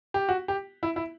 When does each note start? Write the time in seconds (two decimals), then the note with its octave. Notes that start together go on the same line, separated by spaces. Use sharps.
0.14 G4
0.29 F#4
0.48 G4
0.83 E4
0.96 E4